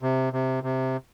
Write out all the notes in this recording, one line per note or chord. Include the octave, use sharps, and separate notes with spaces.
C3
C3
C3